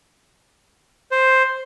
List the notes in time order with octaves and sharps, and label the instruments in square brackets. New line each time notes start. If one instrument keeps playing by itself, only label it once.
[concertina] C5